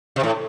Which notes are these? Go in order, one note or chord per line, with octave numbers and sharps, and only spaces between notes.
C3
A2